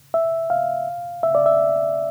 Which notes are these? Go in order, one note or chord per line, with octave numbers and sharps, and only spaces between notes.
E5
F5
E5
D5
E5